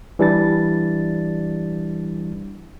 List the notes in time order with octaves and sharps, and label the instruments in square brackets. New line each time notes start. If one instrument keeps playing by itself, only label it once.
[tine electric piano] E3 G3 D4 A6